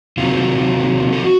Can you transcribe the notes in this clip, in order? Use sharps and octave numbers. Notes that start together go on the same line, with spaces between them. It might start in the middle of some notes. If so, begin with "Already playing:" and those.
C3 D#3 F#3 F4
A4
F#4